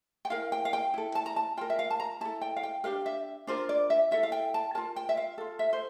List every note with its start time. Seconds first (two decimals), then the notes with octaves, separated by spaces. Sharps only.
0.25 G5
0.30 E4 A#4 F5
0.52 G5
0.65 F5
0.73 G5
0.94 E4 A4
1.15 A5
1.26 A#5
1.36 A5
1.57 F4 A#4 G5
1.70 E5
1.79 F5
1.90 A5
2.00 A#5
2.21 E4 A4 A5
2.42 G5
2.56 F5
2.63 G5
2.84 D4 G4 A#4 F5
3.06 E5
3.47 D4 F4 A#4 C5
3.69 D5
3.90 E5
4.11 E4 A4 E5
4.23 F5
4.32 G5
4.54 A5
4.75 F4 A#4 A5
4.96 G5
5.09 E5
5.17 F5
5.38 F4 A4
5.59 E5
5.73 C5